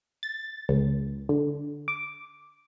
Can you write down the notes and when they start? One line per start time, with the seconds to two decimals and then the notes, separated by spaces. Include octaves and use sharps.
0.23 A6
0.69 C#2
1.29 D3
1.88 D6